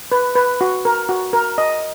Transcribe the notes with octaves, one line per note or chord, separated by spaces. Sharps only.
B4
B4
F#4
A#4
F#4
A#4
D#5